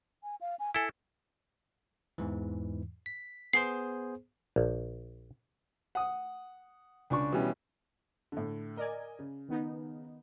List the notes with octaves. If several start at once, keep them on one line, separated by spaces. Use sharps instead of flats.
G#5
F5
G#5
E4 A4 G#5
E2 G#2 E3
B6
B3 G#4 C5 C7
A#1
F#5 D#6
C#2 D4 C#6
B2 E3 G3 C#4
A2 D3
A#4 D5 D#5 G#5
C#3
D#3 B3 D#4